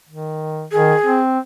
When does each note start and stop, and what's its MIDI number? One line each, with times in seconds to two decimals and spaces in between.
0.09 0.67 51
0.72 0.94 51
0.72 1.18 68
1.06 1.39 60